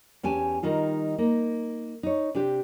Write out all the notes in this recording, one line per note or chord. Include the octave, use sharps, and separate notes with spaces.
E2 C#4 G4 G#5 A5
D#3 G3 D#4 F4
A#3 D#4
D#4 C#5
C3 D4 G4